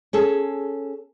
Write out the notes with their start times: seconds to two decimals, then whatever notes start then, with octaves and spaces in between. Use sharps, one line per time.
0.13 C#4 G#4 A4